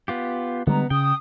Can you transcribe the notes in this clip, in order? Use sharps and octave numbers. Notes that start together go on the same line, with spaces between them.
B3 F4 G4
D3 G3 G#3 B3 A#5
C#3 G5 D#6